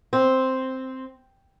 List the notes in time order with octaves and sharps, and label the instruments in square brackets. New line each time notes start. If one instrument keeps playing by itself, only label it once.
[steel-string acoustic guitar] C4